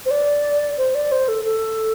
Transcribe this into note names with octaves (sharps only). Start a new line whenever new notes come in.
C5
D5
C5
D5
C5
A4
A4